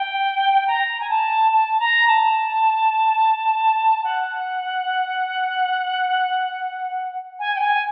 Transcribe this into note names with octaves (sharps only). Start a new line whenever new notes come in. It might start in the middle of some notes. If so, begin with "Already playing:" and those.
Already playing: G5
A#5
G#5
A5
A5
A#5
A5
F#5
G#5
G5
G#5